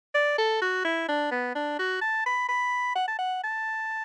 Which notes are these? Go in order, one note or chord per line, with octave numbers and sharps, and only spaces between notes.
D5
A4
F#4
E4
D4
B3
D4
F#4
A5
B5
B5
F#5
A5
F#5
A5